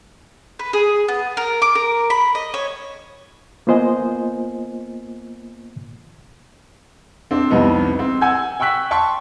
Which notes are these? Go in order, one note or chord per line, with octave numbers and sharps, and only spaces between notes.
B4
G#4
B3
A#4
D6
A#4
B5
D#5
C#5
A#3 B3 F4 C5 D#5 G#5
C4 D4
C2 F2 B3 D#4
C4
F#5 G#5 E6 G6 G#6
G5 C#6 E6 F#6 B6
G5 A5 C6 C#6